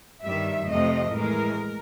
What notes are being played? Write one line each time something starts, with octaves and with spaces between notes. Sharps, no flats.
G2 D#3 G3 E5
F2 C3 F3 A3 D#5
A2 E3 G#3 A#4